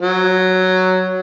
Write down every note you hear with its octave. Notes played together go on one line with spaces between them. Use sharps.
F#3